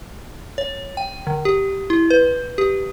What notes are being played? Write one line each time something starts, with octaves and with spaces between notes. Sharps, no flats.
C#5
G5
D3
G4
E4
B4
G4